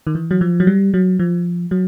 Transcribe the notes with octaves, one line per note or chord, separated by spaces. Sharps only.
D#3
E3
F#3
F3
F#3
G3
F#3
F3
F#3